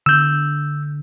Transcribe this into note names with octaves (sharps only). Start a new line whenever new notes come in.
D3 E6 G6